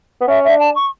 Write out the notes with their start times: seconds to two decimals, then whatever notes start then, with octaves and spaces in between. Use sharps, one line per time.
0.21 B3
0.28 C#4 E5
0.44 D4 E5
0.59 A5
0.75 C#6